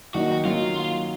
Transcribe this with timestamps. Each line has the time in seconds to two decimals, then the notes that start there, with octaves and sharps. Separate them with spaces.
0.14 D#3 F#3 A#3 D#4 F#4
0.45 D#3 F#3 A#3 D#4 F4